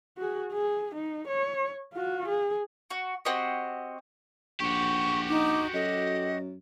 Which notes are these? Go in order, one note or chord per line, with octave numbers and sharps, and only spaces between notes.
F#4 G#4
G#4
D#4
C#5
F4 F#4
G#4
F#4
C4 F#4 G4 D#5
A#1 F#4 G4 C#6
D#4 D6
F#2 A4 D#5